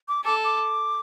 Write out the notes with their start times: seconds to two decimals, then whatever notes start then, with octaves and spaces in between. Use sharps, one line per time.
0.08 D6
0.25 A4 D6
0.44 D6